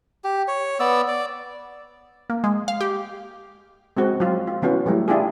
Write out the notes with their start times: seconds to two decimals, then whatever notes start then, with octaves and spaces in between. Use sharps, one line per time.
0.24 G4
0.48 C#5
0.80 B3 D5 E6
1.08 D5
2.30 A#3
2.44 G#3
2.68 F5
2.81 G4
3.97 G#3 C4 F#4
4.20 F#3 F4
4.47 F4
4.62 E3 B3 C#4 F#4
4.86 E3 F#3 G3 A3
5.08 D4 E4 F4 G4 G#4